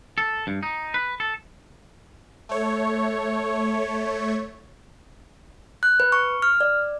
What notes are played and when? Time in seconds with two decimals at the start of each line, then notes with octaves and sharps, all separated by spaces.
0.18 A4
0.47 G2
0.63 D#4
0.94 B4
1.20 A4
2.49 A3 C#5
5.83 F#6
6.00 B4
6.12 C#6
6.42 F6
6.61 D5